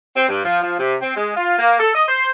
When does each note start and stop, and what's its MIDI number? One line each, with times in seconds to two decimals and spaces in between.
0.16 0.27 60
0.29 0.43 43
0.44 0.61 53
0.63 0.78 53
0.79 0.96 48
1.02 1.16 60
1.16 1.32 56
1.36 1.54 65
1.59 1.77 58
1.80 1.92 69
1.94 2.07 75
2.08 2.30 72